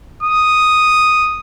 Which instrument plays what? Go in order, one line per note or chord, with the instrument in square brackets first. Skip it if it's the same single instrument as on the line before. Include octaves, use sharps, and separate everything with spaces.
[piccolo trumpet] D#6